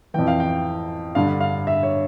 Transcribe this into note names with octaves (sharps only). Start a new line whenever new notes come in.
F2 E3 G5
F5
G5
G2 D3 F5
F5
E5
C#5